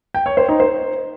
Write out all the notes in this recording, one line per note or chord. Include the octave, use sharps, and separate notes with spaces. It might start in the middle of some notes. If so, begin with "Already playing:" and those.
G5
C#5
C5
D#4
C5